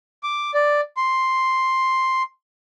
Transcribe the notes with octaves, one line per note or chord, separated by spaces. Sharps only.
D6
D5
C6